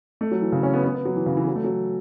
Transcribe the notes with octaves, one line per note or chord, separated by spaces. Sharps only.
A3
F#3
E3
C#3
C#4
B3
B3
B3
F#3
E3
C#3
E3
F#3
A3
F#3